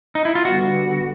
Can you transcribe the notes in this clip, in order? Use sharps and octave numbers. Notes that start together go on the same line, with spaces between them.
D#4
E4
F4
D3 G3 B3 F#4